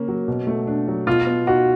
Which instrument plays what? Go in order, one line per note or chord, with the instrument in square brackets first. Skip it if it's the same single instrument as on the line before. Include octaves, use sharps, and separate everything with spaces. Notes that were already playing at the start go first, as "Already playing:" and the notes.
Already playing: [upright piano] C#3 A#3 C#4
F#3
B2
A3
D4
F#3
[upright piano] B2 [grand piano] F4
[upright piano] B3
[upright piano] D#4 [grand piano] F#4